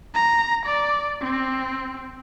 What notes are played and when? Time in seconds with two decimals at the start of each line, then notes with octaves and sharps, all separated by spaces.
0.15 A#5
0.66 D5
1.22 C4